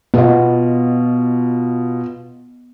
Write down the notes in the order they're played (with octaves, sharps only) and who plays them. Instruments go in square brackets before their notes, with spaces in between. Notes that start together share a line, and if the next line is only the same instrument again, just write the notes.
[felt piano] B2 F4 [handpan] B3 D#5